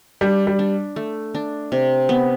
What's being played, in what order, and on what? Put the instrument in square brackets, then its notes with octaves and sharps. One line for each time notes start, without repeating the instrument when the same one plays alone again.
[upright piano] G3 [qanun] D4
[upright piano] G3
[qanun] D4
A3
D4
C3
B3